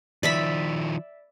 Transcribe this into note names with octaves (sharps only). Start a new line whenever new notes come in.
D#3 F3 D5 E5 B5